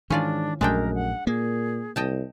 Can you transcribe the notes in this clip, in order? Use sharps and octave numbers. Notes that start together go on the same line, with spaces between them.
G#2 D#3 E3 C#4 D4 F4 D5
A#1 F#2 G#3 A3 D4 A#4 G5
F#5
A#2 A#3 G#4
C2 D#5 G5 A5